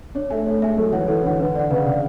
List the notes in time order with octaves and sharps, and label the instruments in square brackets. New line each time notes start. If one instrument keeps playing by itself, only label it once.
[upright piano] D4 [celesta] C#5
[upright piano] A3 [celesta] E5 G#5
[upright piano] A3 [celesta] C#5
[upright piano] G#3 [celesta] E5 G#5
[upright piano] F#3 [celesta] A4
[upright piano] E3 [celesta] C#5 F#5
[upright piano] E3 [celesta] A4
[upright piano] D3 [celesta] C#5
[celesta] F#5
[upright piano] D3 [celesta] B4
[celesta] D5 F#5
[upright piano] C#3 [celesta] B4
[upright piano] C#3 [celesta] D5 F#5